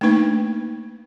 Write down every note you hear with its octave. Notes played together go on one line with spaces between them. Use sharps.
A3 A#3 D4 D#4 B4